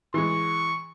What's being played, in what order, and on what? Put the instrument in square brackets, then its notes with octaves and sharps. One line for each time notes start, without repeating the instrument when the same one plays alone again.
[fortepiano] E3 G#3 [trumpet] C#6